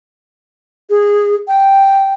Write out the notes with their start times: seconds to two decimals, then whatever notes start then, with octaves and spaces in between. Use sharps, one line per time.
0.90 G#4
1.48 G5